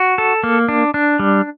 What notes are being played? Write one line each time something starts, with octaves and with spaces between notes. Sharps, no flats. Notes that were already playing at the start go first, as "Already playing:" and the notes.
Already playing: F#4
A4
A#3
D4
D4
G3